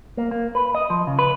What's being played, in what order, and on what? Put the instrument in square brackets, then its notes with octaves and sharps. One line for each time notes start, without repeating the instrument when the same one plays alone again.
[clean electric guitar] A#3
A#3
B4
D#5
F3
C#3
B4